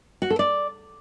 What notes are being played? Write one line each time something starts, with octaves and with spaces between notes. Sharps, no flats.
F#4
A4
D5